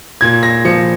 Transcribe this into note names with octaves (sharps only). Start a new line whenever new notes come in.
A#2 G#6
A#6
F3 C#7